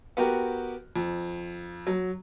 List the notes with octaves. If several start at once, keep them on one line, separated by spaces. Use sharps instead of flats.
B3 F#4 G4 A#4
F2
F#3